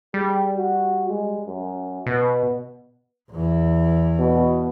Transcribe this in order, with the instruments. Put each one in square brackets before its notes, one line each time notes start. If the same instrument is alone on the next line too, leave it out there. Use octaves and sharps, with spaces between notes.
[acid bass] G3 [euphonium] G#4
[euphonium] F#4
G#3
F#2
[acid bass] B2 [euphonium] B3
[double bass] E2 E3
[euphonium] B2